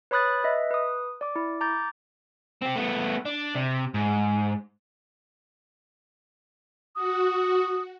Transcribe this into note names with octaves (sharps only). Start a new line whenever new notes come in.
B4 C#5 B5 D#6 F#6 A6
B4 D#5 E5
B4 D#6
D5 D6
E4
A#5 D6 G6 A6
C4 G4
A3 B3
D4
C3
G#2
F#4 D#6